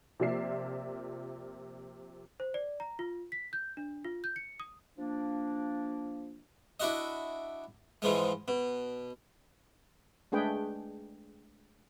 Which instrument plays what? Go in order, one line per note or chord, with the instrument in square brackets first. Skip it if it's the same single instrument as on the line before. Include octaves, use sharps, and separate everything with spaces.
[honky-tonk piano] C3 F3 A#3 D5 E5 C7
[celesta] C5
D5
A#5
F4
B6
G6
D4
F4
G6
C#7
D#6
[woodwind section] F3 A#3 D4
[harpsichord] D4 E4 F#4 D#5
G#2 E3 F3 G#3
B2
[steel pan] G#3 A3 D4 G#4 B4 G5